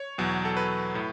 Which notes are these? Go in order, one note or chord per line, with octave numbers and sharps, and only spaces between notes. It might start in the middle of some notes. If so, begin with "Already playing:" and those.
Already playing: C#5
E2 B2 F#3
A4
B4
A2